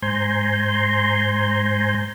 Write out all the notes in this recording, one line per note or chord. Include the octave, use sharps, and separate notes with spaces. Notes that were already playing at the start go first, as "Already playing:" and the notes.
G#2 C5 G#5 A#5 C6 G6